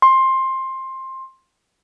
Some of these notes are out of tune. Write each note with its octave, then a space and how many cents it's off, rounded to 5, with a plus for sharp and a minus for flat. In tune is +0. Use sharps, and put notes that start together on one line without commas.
C6 +15